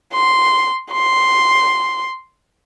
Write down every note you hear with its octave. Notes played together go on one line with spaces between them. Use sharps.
C6
C6